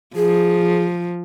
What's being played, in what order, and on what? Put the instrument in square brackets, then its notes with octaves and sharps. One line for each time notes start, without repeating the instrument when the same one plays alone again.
[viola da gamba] F3 [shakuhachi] G#4